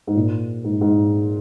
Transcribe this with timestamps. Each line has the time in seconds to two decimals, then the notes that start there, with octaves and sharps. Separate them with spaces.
0.07 G#2
0.16 A#2
0.64 G#2
0.81 G#2